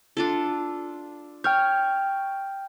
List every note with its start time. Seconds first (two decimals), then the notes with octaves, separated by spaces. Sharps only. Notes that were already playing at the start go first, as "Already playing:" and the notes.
0.17 D4 F4 A4
1.44 C#5 G5 F6 G6